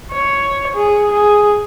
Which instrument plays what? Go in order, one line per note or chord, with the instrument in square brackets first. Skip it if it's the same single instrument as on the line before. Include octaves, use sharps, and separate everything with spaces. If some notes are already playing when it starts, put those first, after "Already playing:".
[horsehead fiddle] C#5
G#4
G#4